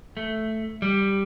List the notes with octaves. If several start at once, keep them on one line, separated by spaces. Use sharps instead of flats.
A3
G3